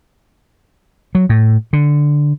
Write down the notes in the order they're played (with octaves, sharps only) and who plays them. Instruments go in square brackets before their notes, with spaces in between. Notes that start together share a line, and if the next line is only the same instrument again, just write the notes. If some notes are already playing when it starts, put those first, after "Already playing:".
[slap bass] F#3
A2
D3